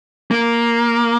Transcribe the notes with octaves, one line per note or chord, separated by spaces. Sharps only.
A#3